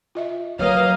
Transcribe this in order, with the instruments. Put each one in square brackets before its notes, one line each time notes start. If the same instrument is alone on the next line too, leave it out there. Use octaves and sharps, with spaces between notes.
[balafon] F4 D#5 E5
[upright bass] F#3 [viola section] A#3 D#5 F5 [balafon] B4 C#5